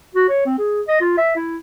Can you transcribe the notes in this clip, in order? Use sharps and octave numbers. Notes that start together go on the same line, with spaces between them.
F#4
C#5
C4
G#4
D#5
F4
E5
E4